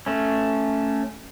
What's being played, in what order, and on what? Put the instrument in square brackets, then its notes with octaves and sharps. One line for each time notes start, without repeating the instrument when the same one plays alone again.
[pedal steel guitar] A3 C#4